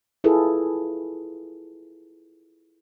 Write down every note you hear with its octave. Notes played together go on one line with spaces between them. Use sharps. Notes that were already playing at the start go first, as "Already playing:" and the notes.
E4 F4 G#4 A4 B4